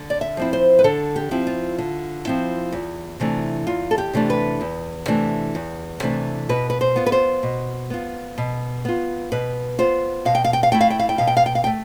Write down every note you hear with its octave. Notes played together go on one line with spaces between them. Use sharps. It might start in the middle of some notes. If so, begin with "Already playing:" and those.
Already playing: D3
D5
E5
F3 C4 E4
C5
B4
D3 A4
G4
F3 C4 E4
F4
D3
F3 C4 E4
E2
C3 E3 A3 D4
E2 F4
A4
G4
C3 E3 A3 D4
B4
E2
C3 E3 A3 D4
E2
C3 E3 A3 D4
B2 B4
B4
C5
B3 F4
B4
C5
B2
B3 F4
B2
B3 F4
B2 B4
B3 F4 C5
B2 F5
G5
F5
G5
F5
A3 E4 G5
F5
G5
F5
G5
B2 F5
G5
F5
G5
F5
G5
A3